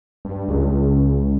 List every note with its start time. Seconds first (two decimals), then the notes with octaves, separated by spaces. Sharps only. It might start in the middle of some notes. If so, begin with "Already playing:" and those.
0.25 G2
0.48 C#2